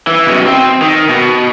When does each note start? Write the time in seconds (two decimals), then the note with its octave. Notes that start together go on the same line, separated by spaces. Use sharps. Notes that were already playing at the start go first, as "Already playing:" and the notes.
0.07 E3
0.27 F#2 B2
0.46 C4
0.82 D#3
1.09 B2